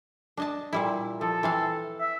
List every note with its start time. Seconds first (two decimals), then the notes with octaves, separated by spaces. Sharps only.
0.37 D4 D#5 A5
0.73 A#2 G3 E4
1.21 F3 A4
1.43 E3 C4 F5
2.00 E5